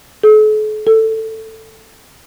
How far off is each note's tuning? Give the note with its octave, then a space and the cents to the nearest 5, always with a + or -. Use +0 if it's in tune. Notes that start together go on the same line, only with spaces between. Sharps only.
A4 -45
A4 +10